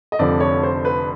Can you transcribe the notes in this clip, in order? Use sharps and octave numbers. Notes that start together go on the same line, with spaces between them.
D#5
F1 F2 D3 F3 D5
C#5
C5
B4